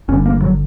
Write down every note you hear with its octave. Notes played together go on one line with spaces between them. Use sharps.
G1 G2 D3 C#4
A#3
F#3